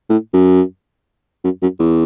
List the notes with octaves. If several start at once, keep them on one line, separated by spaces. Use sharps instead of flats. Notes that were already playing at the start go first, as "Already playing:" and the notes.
A2
F#2
F#2
F#2
E2